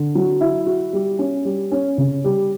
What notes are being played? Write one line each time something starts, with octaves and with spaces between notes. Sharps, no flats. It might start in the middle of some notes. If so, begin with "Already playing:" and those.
Already playing: D3
F#3
E4
F#4
G3
C#4
G3
C#4
C#3
G3